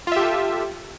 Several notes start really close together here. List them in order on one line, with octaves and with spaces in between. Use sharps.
F4 E5 G4 A4